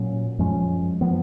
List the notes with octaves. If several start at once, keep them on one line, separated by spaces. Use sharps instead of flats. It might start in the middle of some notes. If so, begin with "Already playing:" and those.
Already playing: A#2 F#3 C#4
F#2 F3 G#3 C#4
F3 B3